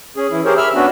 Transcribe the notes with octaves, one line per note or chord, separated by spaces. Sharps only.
C#4 G#4
E3 E4
G4 G#4 A#4 C5 C#5
E5 B5 E6 F6
B3 C#4 D4 F#4